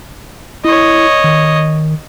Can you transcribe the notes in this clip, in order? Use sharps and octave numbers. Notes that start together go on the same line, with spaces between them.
E4 C#5 D#5
D#3